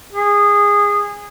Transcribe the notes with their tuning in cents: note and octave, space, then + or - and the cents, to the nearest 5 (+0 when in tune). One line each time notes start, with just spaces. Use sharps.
G#4 -20